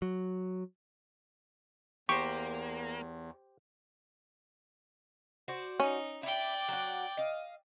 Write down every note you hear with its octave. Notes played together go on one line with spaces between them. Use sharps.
F#3
E2 A#3 G4 C5 C#6
F#4 C5 D5
C#4 D#4
E4 D5 G5
F#3 F#5
D#5 F5